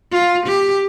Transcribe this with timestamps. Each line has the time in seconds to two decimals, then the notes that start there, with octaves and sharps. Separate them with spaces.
0.12 F4
0.46 G4